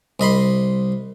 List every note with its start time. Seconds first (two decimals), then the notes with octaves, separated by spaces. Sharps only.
0.20 C2 D#5 B5 C6